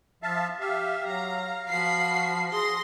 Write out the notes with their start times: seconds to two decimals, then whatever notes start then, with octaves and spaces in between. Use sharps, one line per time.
0.23 F3 E5 F5 A5
0.60 G4 E5 F5
1.06 F#3 F5 A#5
1.68 F3 F#4 B5 C7
2.52 G#4 C6 A#6